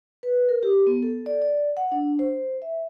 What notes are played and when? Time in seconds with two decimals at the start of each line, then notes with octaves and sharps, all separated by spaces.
0.23 B4
0.49 A#4
0.63 G4
0.87 B3
1.03 A4
1.26 D5
1.42 D5
1.77 F#5
1.92 D4
2.19 C5
2.62 E5